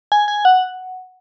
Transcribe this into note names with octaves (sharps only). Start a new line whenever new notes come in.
G#5
G#5
F#5